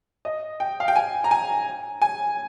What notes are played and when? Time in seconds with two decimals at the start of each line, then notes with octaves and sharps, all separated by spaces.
0.25 D#5
0.60 G5
0.80 F5
0.88 G5
0.96 G#5
1.24 A#5
1.31 G#5
2.02 G#5